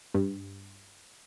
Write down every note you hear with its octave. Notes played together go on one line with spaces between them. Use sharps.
G2